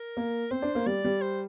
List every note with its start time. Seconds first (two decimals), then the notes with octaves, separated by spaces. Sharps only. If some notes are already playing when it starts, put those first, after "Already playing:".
Already playing: A#4
0.17 A#3
0.51 C4 C5
0.62 D4
0.75 A#3
0.86 G3 D5
1.05 G3
1.22 C5